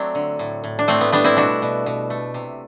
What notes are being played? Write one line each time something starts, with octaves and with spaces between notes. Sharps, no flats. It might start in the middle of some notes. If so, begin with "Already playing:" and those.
Already playing: F#3 A3 C4 D4
D3
A2
A2
D4
A2 A3 C4
B3
G3 B3 D4
C4 E4
B2 D4 F#4
B2
B2
A3
C3